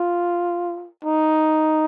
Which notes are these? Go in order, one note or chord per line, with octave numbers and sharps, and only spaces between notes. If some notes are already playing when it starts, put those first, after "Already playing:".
Already playing: F4
D#4